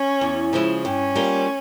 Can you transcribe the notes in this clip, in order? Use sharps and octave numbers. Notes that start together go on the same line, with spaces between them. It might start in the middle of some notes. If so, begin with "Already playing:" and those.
Already playing: C#4
E2
C#3 F3 G#3 E4
G2 C#4
G3 A#3 F4